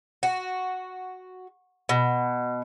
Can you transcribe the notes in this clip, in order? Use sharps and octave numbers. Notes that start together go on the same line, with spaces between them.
F#4
B2